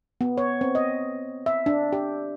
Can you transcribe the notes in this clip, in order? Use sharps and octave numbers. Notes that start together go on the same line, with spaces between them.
B3
C#5
C4
D#5
E5
D4
G4